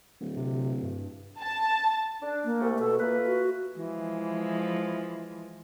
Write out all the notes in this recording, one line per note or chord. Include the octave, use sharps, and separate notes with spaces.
D1
C3
G2
A5
D4
A#3
C2 A3
B2 A4
A3 A#3 F4 B4
F#4
E3 F3 G#3